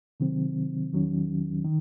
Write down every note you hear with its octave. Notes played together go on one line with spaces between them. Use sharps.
C3 D#3 F#3 C4
E2 D#3 F#3 C#4
D#3